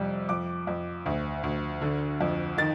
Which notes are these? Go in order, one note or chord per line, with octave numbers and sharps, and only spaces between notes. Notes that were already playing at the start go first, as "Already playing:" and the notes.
Already playing: F2 C3 G3
F2 D6
F2
D2
D2
D3
F2
D#3 A6